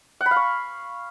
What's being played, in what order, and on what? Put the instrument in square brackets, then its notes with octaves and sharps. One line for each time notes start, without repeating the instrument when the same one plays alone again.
[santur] F#5
B5
F5
C#6